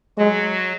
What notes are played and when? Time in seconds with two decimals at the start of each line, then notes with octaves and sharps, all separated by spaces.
0.18 F#3 G#3 F#4